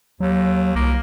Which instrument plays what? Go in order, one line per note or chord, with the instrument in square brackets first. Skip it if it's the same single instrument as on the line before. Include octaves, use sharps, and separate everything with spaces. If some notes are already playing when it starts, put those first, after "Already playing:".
[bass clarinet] D#2 [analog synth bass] F#3
[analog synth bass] C2 [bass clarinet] A#3